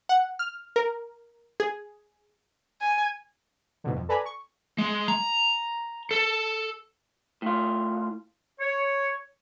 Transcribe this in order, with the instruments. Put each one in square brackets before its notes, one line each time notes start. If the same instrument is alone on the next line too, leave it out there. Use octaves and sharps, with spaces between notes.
[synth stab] F#5
F6
A#4
G#4
[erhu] G#5
[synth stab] G#2 B2 D3
F2
A4 B4 D5 G#5 A#5 B5
C#6
[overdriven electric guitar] G#3
A#5
A4
[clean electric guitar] A2 F4
[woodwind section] C#5